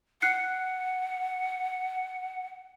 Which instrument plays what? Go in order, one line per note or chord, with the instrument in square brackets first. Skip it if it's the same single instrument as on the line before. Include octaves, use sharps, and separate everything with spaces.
[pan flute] F#5 [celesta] F#6 C7 C#7